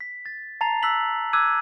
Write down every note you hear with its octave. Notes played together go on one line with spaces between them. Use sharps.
B6
A6
A5 A#5 A6 C7 F7
E6 F#6 B6 F#7
D6 E6 F#6 G#6 D#7